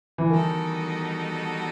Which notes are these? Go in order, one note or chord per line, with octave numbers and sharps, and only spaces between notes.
E3
D#3 G3 B3 D#4 F#4 A4